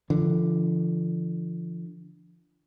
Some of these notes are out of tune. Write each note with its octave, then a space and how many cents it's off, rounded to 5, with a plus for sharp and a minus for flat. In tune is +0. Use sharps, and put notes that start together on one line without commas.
D3 +0 F3 -35